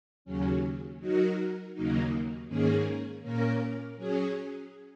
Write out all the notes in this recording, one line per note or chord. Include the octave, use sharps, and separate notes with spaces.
D#2 C#3 F#3 C#4
F#3 D#4 F#4 A#4
D#2 C#3 F#3 A#3 D#4
G#2 D#3 A#3 C#4 G#4
A#2 A#3 C#4 A#4
F#3 C#4 G#4